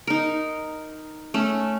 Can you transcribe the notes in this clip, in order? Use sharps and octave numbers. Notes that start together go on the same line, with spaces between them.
D#4 A#4
A3 C#4